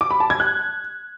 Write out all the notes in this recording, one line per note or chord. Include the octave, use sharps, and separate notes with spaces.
D6
B5
A5
G#6
F#6